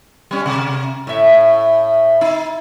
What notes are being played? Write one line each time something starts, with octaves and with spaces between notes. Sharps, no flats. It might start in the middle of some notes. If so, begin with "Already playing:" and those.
G3 C#4
C3
A2 E5
D#4